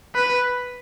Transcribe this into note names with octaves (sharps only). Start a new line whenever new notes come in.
B4